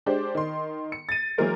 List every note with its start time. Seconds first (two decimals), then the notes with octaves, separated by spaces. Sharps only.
0.06 G#3 D4 G4 C5
0.35 D#3 C6
0.92 C#7
1.09 A6 D#7
1.38 E3 F#3 G#3 A#3 A#4 C5